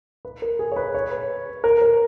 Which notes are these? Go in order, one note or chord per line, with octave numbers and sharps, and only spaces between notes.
B4
A#4
G#4
C#5
B4
C#5
B4
A#4
A#4